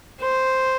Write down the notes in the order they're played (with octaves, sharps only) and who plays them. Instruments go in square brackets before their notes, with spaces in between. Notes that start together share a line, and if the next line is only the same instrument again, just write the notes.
[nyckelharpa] C5